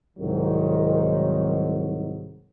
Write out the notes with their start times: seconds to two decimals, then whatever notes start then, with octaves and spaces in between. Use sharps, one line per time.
0.17 C2 G#2 D#3 F#3